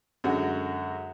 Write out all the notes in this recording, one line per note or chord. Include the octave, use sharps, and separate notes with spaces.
F#2 D3 G#3 F#4